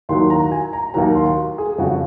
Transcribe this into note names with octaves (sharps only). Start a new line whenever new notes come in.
D#2 D#3 F#3 C6
A#5
G#5
A#5
D#2 D#3 F#3 A#5
C6
G#4
F2 C#3 F3 F#4